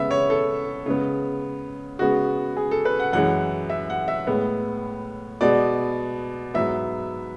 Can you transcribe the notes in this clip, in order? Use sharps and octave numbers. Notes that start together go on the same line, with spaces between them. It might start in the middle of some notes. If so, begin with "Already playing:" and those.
Already playing: C#3 G#3 B3 E5
C#5
A4
C#3 G#3 B3
C#3 G#3 B3 F#4
G#4
A4
B4
F#5
F#2 E3 G#3 F#5
E5
F#5
E5
A2 G#3 B3
B2 G#3 B3 D5
G#2 F#3 B3 E5